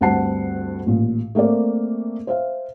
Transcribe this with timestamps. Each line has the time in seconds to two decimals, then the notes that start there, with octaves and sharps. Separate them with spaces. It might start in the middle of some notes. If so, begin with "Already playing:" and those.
0.01 D2 G2 C4 F#5 A5 C7
0.86 A1 A#2
1.35 A3 A#3 C4 A#4 D5
2.27 C5 E5 F5